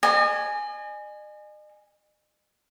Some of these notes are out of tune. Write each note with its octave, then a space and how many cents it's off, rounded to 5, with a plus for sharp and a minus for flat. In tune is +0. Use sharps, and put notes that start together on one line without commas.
D#5 -40 G#5 +0